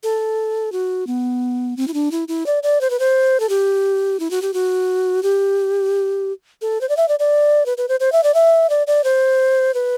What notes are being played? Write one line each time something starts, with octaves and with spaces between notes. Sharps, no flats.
A4
F#4
B3
C4
E4
D4
E4
E4
D5
D5
C5
B4
C5
A4
G4
E4
F#4
G4
F#4
G4
A4
C5
D5
E5
D5
D5
B4
B4
C5
C5
E5
D5
E5
D5
D5
C5
B4